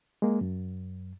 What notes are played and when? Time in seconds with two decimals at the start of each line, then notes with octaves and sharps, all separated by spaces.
0.22 G#3 A#3
0.41 F#2